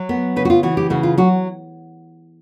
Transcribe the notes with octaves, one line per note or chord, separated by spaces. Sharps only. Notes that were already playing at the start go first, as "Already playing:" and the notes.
Already playing: F#3
B3
C#3 B4
F#4
F4
E3 F#4
G4
C#3 F#4
F4
F#3 F#4